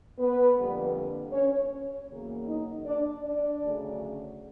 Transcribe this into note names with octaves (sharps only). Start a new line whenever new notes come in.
B3 B4
F2 D3 G3 A#3
C#4 C#5
E2 C#3 F#3 A#3
D#4 D#5
D4 D5
D4 D5
D2 C#3 F#3 A3